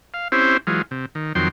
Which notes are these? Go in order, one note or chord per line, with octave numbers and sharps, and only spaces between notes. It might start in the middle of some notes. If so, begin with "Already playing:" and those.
F5
C4 C#4 E4 G4 C5
E3 F#3 G#3 F4
C3
D#3
F2 D#3 F#3 G5 C6